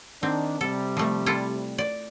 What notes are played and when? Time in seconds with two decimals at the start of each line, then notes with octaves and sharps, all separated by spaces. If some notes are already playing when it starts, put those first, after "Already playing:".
0.23 D#3 C4 D4
0.61 C3 G3 A4
0.97 F3 A3
1.26 E4 F4 A4
1.78 D5